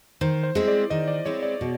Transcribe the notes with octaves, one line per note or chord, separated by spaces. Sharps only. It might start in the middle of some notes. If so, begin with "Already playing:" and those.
D#3 C5
C5
G#3 C4 E4
D5
D#3 D#5
D5
G#3 C4 E4 C#5
D5
B2